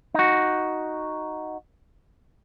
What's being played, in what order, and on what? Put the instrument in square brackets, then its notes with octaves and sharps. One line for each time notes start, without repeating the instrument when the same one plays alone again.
[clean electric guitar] D#4 F#4